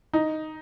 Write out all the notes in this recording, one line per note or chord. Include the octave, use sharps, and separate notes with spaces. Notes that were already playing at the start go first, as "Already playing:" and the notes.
D#4